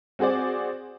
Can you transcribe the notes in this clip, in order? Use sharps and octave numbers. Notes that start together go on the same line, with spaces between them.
C4 F#4 G#4 C5 D5